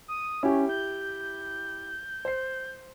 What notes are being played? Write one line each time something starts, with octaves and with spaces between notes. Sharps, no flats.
D#6
C#4 E4 G4
G6
C5 C7